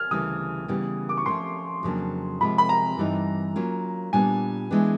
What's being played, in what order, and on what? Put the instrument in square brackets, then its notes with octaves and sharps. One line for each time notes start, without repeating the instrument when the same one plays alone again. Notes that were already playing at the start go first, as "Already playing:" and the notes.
Already playing: [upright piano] F6 G#6
[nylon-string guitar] D2 C#3 E3 G3 [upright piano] D#6
[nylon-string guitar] C#3 E3 G3 B3
[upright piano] D6
C#6
[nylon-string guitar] F3 A3 C#4 F4 [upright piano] C6
[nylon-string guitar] F2 C#3 F#3 A#3 D4
[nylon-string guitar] C3 F3 G#3 C4 F4 [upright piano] B5
[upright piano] B5
A#5
[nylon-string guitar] G2 E3 G3 C4 D#4
F#3 A#3 C#4 F4
[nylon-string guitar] A#2 G3 B3 D4 [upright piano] G#5
[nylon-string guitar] E3 G#3 B3 D4